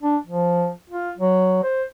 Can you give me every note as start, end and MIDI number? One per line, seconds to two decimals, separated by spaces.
0.02 0.17 62
0.27 0.71 53
0.90 1.11 65
1.17 1.60 54
1.63 1.84 72